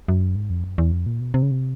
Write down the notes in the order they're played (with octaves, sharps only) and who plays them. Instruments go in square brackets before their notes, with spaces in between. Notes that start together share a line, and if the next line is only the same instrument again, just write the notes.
[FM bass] F#2
G#2
F2
F#2
E2
F2
A#2
B2
C3
C#3
C3